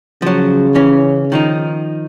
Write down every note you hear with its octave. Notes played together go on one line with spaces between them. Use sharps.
C#3 F3 F#3
E3 C#4
D#3 F3 D#4